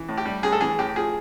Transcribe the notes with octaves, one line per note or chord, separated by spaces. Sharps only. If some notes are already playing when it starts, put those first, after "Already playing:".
Already playing: E3
A2
G4
G3
A2 G#4
A4
E3 G#4
A2 G4
F3 G#4